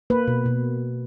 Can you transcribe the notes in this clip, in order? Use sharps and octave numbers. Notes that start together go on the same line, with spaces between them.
A#3 B4
B2
B2